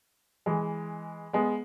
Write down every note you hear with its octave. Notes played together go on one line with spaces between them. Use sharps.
E3 G#3
G#3 B3